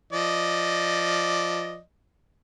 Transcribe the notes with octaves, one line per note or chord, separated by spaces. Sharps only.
F3 D5 D#5